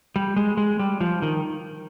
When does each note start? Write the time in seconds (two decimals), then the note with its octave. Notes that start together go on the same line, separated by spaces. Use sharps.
0.16 G3
0.37 G#3
0.57 G#3
0.79 G3
1.01 F3
1.22 D#3